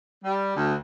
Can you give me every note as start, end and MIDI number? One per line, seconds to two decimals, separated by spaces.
0.24 0.56 55
0.56 0.73 38